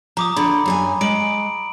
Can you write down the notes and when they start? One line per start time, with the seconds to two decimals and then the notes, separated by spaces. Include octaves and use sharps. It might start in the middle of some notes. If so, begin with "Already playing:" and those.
0.17 F3 A#5 D6 D#6
0.36 D3 B5
0.66 F#2 G#4 G#5
1.01 G#3 D7 F#7